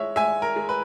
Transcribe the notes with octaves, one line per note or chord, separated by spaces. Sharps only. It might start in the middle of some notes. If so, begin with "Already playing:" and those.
Already playing: G#3 C#5 E5
G#3 E5 G#5
A#4
G#3
B4